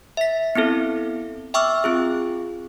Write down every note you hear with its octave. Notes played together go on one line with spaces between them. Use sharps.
E5 B6
B3 C4 E4 A4
E5 G5 C#6 D6 E6 F6
C4 F4 G#4